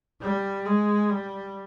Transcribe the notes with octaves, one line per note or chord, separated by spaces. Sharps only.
G3
G#3
G3